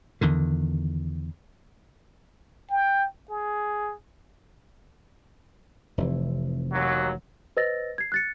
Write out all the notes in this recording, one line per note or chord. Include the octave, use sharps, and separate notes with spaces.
E2 D3 D#3
G5
G#4
F1 C3 E3
D#2 F#3
B4 C5 D#5 E6 A6 A#6
G#6 C7
F#6 A6 C#7